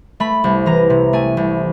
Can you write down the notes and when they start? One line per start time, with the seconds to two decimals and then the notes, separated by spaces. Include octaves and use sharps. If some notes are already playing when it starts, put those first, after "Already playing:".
0.20 A3 B5
0.44 C2
0.66 E3 A#5
0.90 C3
1.13 A3 G#5
1.37 C2